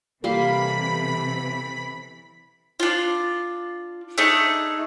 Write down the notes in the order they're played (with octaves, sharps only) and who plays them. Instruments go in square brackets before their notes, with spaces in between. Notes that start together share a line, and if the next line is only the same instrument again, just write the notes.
[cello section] C3 [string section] E3 B5 [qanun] G3 A#3 C6 [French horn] A4
[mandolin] D4 F4
A3 D4 D#4 G#4